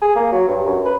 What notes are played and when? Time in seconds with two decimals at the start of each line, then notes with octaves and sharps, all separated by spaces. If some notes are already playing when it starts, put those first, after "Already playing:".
0.02 G#4
0.15 A#3
0.32 F#3
0.48 G2
0.66 F#2
0.85 B4